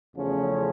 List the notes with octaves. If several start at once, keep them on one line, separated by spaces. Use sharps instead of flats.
E2 C#3 F3 A3 C#4